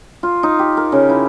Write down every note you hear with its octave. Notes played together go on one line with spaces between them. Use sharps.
F4
D#4
G4
A#4
C#3
E4